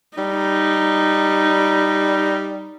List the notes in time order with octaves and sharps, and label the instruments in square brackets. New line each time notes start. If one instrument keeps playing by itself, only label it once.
[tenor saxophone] G3 [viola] D#4